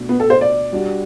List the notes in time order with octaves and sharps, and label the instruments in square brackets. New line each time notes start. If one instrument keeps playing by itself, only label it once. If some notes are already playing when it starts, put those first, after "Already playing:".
Already playing: [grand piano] B2 A3 D4 F#4
[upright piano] B3
A4
C5
D5
[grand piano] G3 D4 F#4